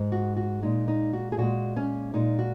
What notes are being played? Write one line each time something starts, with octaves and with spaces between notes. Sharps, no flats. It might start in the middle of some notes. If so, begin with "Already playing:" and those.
Already playing: G#2 G#3
F#4
F#4
A#2 G#3 D#4
D#4
F#4
G#4
A#2 G#3 F#4
C#4
A#2 G#3 D#4
F#4